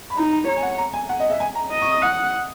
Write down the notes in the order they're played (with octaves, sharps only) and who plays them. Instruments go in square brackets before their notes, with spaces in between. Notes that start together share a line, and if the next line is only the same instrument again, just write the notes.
[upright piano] B5
[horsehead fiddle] D#4 [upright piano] A#5
[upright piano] A#5
[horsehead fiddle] C#5 [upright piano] A#5
[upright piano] G#5
F#5
A#5
G#5
F#5
D#5
E5
G#5
A#5
[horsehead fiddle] D#5
[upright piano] C#6
D#6
[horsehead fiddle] F#5 [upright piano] D#6